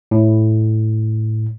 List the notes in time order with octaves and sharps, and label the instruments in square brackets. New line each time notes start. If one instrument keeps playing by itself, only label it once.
[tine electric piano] A2